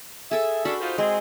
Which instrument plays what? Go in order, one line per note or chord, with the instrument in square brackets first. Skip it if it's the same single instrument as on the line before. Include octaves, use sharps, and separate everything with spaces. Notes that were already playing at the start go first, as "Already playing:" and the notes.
[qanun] G#4 A4 [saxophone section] E5
[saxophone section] C#4 D4 A4 [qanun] F#4 B5
[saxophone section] D#4 F4 C5
[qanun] G#3 [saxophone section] C4 G#4